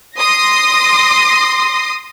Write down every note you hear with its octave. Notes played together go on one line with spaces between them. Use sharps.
C6 D#6 A#6